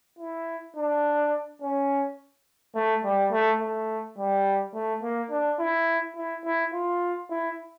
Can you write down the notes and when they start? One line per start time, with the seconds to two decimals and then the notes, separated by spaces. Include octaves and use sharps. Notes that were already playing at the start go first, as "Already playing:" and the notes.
0.19 E4
0.76 D4
1.62 C#4
2.75 A3
3.04 G3
3.32 A3
3.60 A3
4.18 G3
4.74 A3
5.03 A#3
5.31 D4
5.59 E4
6.16 E4
6.45 E4
6.74 F4
7.30 E4